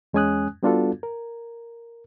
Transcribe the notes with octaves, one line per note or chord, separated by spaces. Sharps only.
E2 G#3 C#4 G#5 D#6 F#6
G3 B3 D4 F4 F#4 A4
A#4